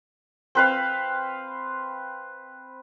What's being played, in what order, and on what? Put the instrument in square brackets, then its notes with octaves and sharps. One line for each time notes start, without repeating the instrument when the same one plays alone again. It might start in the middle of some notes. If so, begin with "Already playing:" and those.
[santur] C4 B4 F5